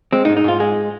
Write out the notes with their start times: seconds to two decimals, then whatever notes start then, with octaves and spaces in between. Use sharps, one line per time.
0.13 G#3 C4
0.25 D#4
0.29 G#2
0.37 D#4
0.44 G#2 F4
0.60 G#3 G#4